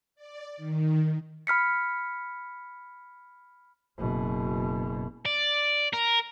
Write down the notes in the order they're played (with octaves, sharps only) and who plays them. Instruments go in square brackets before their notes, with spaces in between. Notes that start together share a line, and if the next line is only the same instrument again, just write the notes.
[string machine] D5
D#3
[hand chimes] B5 F6 B6 C#7
[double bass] F#1 B2
[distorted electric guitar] D5
A#4